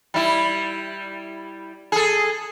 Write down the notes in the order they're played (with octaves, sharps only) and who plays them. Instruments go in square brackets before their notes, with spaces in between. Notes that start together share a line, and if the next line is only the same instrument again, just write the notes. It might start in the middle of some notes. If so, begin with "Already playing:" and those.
[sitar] G3 E4
G#4 A4